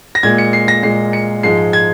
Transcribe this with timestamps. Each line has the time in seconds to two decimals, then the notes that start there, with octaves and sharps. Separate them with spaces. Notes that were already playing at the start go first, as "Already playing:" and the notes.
0.15 A#6
0.23 A#2 G#3 G#6
0.38 C#7
0.53 C7
0.68 A#6
0.83 A#2 G#3 C7
1.13 C#7
1.43 G#2 F3 G#3 C7
1.73 G#6